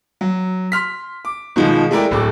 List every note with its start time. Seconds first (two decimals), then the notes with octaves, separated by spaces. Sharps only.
0.21 F#3
0.72 C6 F6 B6
1.25 D6
1.56 B2 D#3 F3 G#3
1.91 G#3 A3 E4 A#4 D5 G5
2.11 D1 A2 A4 D6